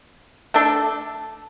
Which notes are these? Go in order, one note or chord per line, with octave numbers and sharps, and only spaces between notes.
A3 D4 A4